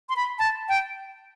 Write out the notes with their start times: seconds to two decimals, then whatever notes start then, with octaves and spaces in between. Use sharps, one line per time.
0.09 C6
0.16 B5
0.39 A5
0.69 G5